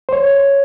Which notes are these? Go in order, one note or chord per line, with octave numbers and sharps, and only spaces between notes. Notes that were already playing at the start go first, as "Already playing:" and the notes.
C5
C#5